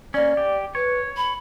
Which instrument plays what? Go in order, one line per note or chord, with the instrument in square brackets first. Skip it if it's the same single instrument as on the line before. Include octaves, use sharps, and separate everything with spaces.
[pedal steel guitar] A#3 C#4 [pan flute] D5
[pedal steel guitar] G4
[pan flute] B4 [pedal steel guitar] C#5
[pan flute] B5